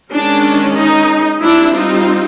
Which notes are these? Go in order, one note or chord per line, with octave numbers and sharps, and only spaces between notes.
D#3 G#3 C#4 D4
D#4
G3 C4 D4 E4
D#4 F4